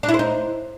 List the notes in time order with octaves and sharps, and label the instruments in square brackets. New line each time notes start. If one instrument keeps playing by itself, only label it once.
[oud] D4
E4
C5
D#4